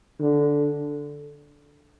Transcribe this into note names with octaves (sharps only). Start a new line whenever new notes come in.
D3